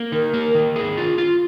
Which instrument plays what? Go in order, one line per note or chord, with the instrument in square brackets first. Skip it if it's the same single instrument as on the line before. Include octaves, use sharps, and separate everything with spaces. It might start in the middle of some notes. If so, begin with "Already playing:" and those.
Already playing: [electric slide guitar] A#3
[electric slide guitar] D#3 [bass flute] A#4
[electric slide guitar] A#3
D#3
G#4
F4
F4